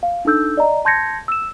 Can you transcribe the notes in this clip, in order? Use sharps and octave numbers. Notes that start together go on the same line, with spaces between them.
F5
D4 D#4 A4 E6 G6
D5 D#5 A#5
A5 C6 G6 G#6 A#6 C#7
E6 E7